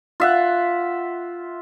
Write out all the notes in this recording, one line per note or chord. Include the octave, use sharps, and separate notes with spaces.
F4 E5 F#5